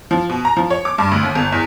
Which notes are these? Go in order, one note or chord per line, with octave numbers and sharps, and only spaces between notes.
F3
B2
A#5
F3
C#5
D6
G2
D2
D#2
G1
E2